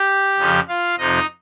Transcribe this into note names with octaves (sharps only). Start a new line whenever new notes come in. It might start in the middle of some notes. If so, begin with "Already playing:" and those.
Already playing: G4 G5
F2 C#3 F3
F4 F5
F2 C3 F3 D#4 D#5